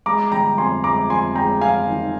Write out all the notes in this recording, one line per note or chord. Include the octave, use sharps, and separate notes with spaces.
G#3 A#5 D6
G1 G5 A#5
F2 G#5 C6
G#3 A#5 D6
F2 G#5 C6
G#3 G5 A#5
F2 F5 G#5
D#3